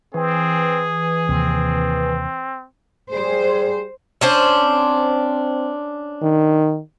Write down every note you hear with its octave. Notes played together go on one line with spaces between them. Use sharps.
E3 C4 G#4
D#2 C3 C4
G3 G#4 C5
C#4 D4 C5
C4
D#3